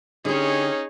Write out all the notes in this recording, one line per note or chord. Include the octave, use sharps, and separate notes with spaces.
D3 C#4 D#4 G4 G#4 C#5